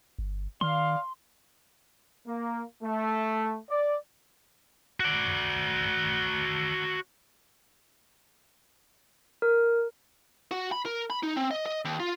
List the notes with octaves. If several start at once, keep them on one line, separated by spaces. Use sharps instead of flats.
G1
D#3 D5 F5 C6
A#3
A3
D5
F#4 D5
A#4
F#4
B5
A#4
B5
D#4
C4
D#5
D#5
D#2
F4